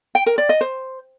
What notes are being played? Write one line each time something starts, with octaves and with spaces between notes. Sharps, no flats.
G5
A#4
D5
D#5
C5